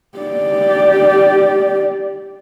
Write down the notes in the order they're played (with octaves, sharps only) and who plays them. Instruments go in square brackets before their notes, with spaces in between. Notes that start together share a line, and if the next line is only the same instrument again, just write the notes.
[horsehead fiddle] G4 D5